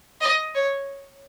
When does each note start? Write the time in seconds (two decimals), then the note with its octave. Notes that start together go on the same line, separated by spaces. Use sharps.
0.21 D#5
0.54 C#5